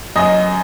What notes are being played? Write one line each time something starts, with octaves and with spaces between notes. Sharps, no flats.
F#2 D#5